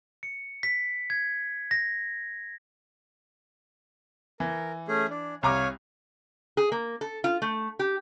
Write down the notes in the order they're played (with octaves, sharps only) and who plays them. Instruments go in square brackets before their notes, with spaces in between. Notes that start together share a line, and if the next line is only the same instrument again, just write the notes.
[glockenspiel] C#7
B6
G#6
A#6
[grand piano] E3 [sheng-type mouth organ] A#4
[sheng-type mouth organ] A3 C#4 G#4
D4
[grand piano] C2 A#5 D6 [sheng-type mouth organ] C#5 F5 G#5
[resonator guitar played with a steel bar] G#4
A#3
A4
F4
A3
G4